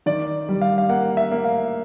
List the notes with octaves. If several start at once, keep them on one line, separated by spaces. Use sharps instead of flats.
D#3 D5
G3
F5
F5
A#3 F#5
E5
A#3
F5